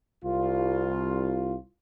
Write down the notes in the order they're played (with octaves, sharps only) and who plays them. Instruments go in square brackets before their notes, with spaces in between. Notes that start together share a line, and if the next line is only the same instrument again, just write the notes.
[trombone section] C2 F4